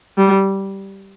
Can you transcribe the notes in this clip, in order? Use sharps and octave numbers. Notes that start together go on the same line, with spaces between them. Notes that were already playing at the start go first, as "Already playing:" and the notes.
G3